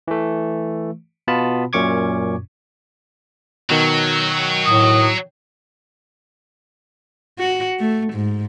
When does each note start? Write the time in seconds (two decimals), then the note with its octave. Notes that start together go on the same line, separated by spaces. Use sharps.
0.08 E3 A3
1.28 B2 B3 F4 A5 B5
1.73 F#2 A#2 C#4 C#6 D6 G#6
3.70 B2 D#3 F#3
4.66 A2 D#6
7.39 F#4
7.79 A3
8.13 G#2